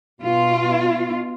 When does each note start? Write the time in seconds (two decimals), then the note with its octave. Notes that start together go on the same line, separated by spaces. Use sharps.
0.23 B2 F4